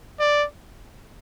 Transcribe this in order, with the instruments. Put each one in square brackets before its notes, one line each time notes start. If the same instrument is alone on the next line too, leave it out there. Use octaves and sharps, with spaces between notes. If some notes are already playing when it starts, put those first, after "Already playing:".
[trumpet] D5